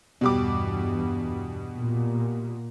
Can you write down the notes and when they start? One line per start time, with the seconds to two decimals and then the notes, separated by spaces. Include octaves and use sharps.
0.21 E2 G2 B2 G3 D6
1.76 A#2